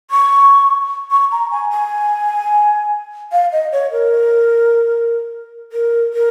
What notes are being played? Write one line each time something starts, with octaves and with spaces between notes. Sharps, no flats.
C#6
C#6
A#5
G#5
G#5
F5
D#5
C#5
A#4
A#4
A#4